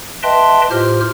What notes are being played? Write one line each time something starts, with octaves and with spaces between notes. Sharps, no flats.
B4 D#5 E5 G5 A5 C6
A2 F4 G4 C5 F6